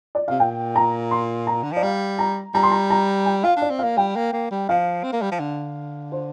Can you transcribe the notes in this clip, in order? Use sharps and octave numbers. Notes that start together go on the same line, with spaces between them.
D5
C3 F5
A#2 G5
A#5
C6
A#5
D3
F3 D5
G3 F5
A#5
G3 A#5
C6
A#5
A#5
G5
F4 F5
D4
D5
C4
A#3 F5
G3 G5
A#3
A#3
G3
F3 F5
C4
A#3
G3
F3
D3
C5